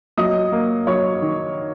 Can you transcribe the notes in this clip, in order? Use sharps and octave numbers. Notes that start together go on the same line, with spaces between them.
F#3 D#5 D#6
A#3
F#3 C#5 C#6
D#3